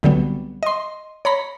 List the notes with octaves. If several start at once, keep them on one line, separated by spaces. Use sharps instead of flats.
C2 D3 F#3 G3 B3
D#5 C6
C#5 A#5 B5